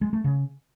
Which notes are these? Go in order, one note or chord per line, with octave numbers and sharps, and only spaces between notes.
G#3
A3
C#3